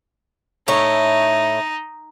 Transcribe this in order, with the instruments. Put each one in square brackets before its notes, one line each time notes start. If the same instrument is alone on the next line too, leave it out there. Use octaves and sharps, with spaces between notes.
[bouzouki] A2 E4 C#5 [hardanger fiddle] D#4